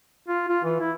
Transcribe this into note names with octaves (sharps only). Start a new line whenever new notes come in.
F4
F4
E3
E4